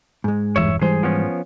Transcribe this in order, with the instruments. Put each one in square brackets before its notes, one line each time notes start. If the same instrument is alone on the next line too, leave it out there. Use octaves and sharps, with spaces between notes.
[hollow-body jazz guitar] G#2 G#3
[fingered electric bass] E1 G2 E3 [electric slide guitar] C#5 E5
[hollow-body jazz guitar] G#2 C5 [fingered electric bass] E3 G3 [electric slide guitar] G#4
[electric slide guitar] F3 B3 C#4